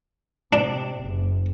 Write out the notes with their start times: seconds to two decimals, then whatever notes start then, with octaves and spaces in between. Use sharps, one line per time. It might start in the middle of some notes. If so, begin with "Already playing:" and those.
0.53 C3 D4
1.01 F#1